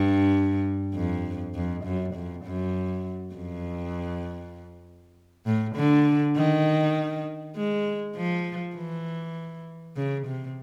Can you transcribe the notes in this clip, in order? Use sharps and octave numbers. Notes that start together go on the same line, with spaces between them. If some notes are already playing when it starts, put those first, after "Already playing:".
Already playing: G2
F2
F2
F#2
F2
F#2
F2
A2
D3
D#3
G#3
F3
E3
C#3
C3